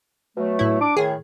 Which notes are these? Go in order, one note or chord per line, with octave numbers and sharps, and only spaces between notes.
B2 F#3 A3
A2 E4
D4 D6
A2 D#3 G#4